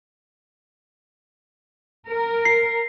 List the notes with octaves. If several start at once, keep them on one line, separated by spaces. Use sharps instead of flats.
A#4
C7